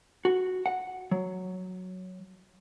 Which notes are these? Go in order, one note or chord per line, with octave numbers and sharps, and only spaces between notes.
F#4
F#5
F#3